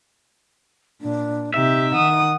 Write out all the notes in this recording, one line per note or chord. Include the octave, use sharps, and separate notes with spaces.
A#2 D4
C3 D#4 G4 E5
D#3 F#5 D#6